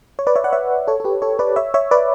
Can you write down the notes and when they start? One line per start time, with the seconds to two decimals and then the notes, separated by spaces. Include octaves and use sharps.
0.19 C#5
0.27 B4 D5
0.36 C#5 E5
0.44 D5 F#5
0.53 C#5 E5
0.88 A4 C#5
1.00 A4
1.04 G4 B4
1.22 A4 C#5
1.39 B4 D5
1.56 C#5 E5
1.74 C#5 E5
1.91 B4 D5